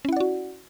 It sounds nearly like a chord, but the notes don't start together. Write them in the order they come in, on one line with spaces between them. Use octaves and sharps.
C#4 E4 F#5 D5 F#4